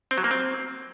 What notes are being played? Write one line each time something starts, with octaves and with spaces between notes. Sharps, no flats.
C4
F#3
A#3
C4